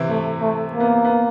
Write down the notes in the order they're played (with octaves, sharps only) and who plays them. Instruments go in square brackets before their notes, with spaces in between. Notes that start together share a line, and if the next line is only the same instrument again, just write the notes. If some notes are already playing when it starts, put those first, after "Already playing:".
Already playing: [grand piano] C3 E3 C4 E4
[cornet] A3
A3
A#3
[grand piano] B3
B3